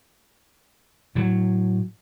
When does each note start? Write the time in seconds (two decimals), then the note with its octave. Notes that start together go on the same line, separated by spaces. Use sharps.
1.15 A2 F#3